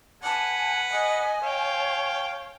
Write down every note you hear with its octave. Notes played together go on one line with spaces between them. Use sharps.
B4 F#5 G#5 A5
D#5 G#5
C#5 F5 G5